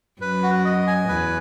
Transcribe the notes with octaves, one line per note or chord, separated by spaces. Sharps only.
F#2 B4
F#4
D#5
G#5
E2 B4